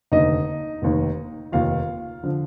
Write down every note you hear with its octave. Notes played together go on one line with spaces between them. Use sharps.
F1 D#2 D3 D#4 D#5
F1 D#2 D#3
F1 D#2 D#3 F4 F5
D3 F3